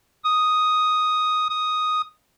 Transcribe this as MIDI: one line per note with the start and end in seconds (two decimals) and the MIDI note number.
0.24 1.49 87
1.50 2.02 87